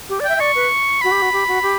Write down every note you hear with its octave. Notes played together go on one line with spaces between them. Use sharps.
G4
D5
E5 G5
E5
D5 C#6
B4
F#4 B5
G4
F#4
G4
F#4
G4